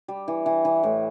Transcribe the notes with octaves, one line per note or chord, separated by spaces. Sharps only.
G3
E3
E3
E3
A2